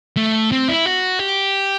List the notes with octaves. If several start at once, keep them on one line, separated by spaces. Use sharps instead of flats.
A3
C4
E4
F#4
G4